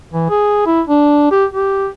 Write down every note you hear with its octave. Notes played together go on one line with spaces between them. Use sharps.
E3
G#4
E4
D4
G4
G4